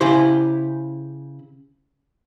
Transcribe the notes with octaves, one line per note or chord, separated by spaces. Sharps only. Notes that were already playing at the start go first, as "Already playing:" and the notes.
C#3 E4 G4 C5